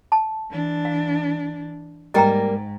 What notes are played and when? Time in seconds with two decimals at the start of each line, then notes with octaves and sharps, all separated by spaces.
0.12 A5
0.50 E3 D4
0.85 F5
2.14 G#2 G3 A#3 A#4 D#5 G5 A#5